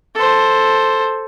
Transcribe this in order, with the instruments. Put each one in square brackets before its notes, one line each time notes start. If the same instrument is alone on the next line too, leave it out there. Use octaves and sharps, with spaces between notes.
[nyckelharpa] A4 C5